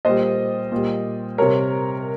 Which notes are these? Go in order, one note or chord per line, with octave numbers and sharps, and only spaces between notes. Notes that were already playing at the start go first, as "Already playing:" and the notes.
A#2 G3 C5 D#5
A#2 G3
C3 G3 A#4 C#5